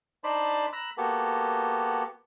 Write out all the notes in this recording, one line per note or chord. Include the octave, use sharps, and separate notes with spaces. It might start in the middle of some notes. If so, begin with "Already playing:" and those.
D4 D#4 C5 D5 A5 B5
A#5 B5 E6 F#6
A#3 B3 F#4 G4 A4